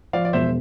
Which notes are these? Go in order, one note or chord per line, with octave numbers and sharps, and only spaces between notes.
F3 D5 F5
D5
E1 C5 E5